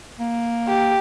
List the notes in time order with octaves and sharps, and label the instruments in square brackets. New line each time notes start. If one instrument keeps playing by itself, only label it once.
[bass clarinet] A#3
[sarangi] G4